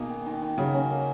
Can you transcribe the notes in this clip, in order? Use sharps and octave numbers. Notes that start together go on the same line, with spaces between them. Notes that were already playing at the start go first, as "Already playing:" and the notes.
Already playing: B2 A#3 D#4 G#4
D#3
D#3
D#3
C#3 F#3
C#4
A#3